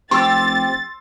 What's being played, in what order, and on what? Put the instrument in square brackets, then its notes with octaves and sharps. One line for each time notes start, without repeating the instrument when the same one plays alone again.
[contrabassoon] F1 [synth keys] C4 G4 [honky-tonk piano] C6 E6 [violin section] A6